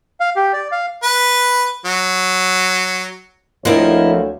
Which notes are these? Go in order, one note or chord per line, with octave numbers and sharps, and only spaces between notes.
F5
G4
D5
F5
B4
F#3
D2 F3 A#3 C4 D#4 E4 C#5